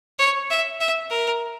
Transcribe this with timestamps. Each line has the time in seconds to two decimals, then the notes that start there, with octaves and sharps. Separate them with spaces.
0.19 C#5
0.50 E5
0.80 E5
1.10 A#4